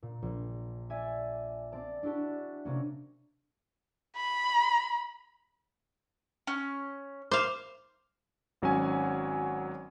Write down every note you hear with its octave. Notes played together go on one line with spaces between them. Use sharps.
A#2
A#1
D5 E5 G#5
C4 D5 A5
D4 E4 F#4 G4 A5
C3 A#3 C#4
B5
C#4
C5 F5 D6
G#1 F#3 C#4 G#5